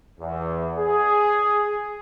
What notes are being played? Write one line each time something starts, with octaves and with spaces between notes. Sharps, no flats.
E2
G#4